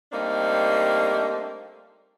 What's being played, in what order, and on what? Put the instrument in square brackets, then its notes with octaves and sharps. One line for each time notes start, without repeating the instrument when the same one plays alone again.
[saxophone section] G3 A3 A#3 C4 D4 D#4